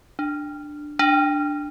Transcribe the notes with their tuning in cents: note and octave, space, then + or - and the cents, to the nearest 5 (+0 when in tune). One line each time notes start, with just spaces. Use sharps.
D4 +15
D4 +10